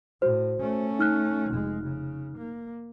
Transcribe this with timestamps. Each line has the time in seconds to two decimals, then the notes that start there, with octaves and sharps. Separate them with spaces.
0.22 A2 F#4 C5
0.60 A3 C#4
0.99 D#4 F6 F#6
1.51 F1 G#3
1.84 C#3
2.37 A#3